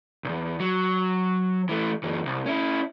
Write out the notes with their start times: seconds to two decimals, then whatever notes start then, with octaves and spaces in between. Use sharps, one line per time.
0.24 B1 E2
0.60 F#3
1.69 E3 A3
2.03 F#2 E3
2.25 C2
2.46 C#4 E4